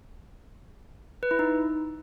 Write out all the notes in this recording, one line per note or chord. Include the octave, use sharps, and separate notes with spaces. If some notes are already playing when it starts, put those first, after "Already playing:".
B4
E4
D#4